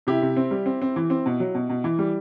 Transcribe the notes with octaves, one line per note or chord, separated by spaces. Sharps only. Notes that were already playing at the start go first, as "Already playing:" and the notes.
C3 E4 G4
C3
C4
G3
C4
C4
E3
C4
B2
F#3
B2
B2
E3
G3